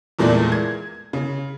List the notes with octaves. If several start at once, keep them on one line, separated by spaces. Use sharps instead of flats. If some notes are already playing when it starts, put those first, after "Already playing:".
E2 A#2 G#3 A3 D5
G#6
C#3